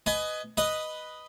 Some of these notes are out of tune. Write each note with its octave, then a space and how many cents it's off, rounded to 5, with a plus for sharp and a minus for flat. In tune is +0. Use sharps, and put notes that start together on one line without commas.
B4 +15 D#5 +0 G#5 +25
B4 +0 D#5 +0